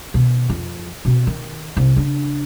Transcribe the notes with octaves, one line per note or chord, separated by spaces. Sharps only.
B2 D#3
F2
B2 C4
D#3
C2
C#3 D4